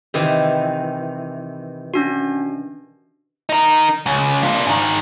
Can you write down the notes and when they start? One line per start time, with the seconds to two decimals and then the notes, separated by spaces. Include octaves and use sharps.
0.14 C3 D#3 E3
1.94 C#4 D4 F#4
3.49 D#4 A#4
4.06 C#2
4.43 D4 F4
4.67 G#2 D#3